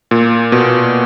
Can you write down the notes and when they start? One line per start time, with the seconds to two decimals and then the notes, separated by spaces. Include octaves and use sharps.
0.11 A#2
0.52 B2